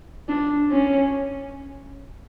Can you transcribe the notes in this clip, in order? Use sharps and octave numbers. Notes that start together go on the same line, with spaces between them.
D4
C#4